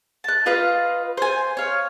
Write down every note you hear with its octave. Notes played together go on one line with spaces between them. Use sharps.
A5 F#6
F4 B4 D#5 F5
C5 G#5
C#5 F5